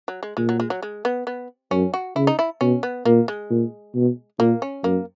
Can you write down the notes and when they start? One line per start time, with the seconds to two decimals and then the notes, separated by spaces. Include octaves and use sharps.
0.08 F#3
0.23 G#3
0.37 A#2 G#3
0.49 F#3
0.60 G#3
0.70 F#3
0.83 G#3
1.05 B3
1.27 B3
1.71 F#2 C#4
1.94 F#4
2.16 C#3 E4
2.27 D#4
2.39 E4
2.61 B2 C#4
2.83 B3
3.05 A#2 A#3
3.28 G#3
3.50 A#2
3.95 B2
4.39 A#2 A#3
4.62 C#4
4.84 F#2 A#3